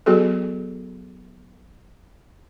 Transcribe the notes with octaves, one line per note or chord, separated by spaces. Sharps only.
F#3 B3 F#4 G#4 A4